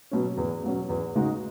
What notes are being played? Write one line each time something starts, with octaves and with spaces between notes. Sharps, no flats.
B2 F#3 C#4
E2
B2 F#3 C#4
E2
C#3 G#3 D#4 F#4